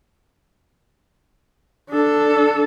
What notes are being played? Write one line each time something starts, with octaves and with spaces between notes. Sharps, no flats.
D4 A4